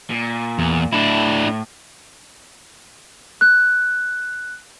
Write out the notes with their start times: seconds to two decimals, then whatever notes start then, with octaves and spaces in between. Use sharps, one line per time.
0.10 A#2
0.59 E2
0.92 A2 D4 E4
3.41 F#6